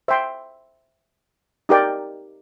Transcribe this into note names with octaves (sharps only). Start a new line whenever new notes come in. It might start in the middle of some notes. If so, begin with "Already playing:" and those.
C5 E5 G5 C6
D#4 G4 A#4 D5 G5